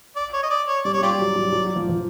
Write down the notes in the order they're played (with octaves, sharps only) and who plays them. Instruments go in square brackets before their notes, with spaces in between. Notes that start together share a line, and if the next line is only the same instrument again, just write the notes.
[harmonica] D5
C#5
D#5
D5
C#5
[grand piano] G3 [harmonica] D5
[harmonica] C#5
[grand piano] G3 [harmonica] F4 G4 D5
[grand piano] F#3
F#3
F#3
F3
F3